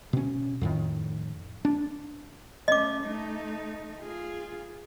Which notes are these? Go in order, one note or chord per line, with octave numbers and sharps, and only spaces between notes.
B2 C#4
F2 A2 D#3
D4
A3 C#4 D#5 D6
A3 D#4
F4 G#4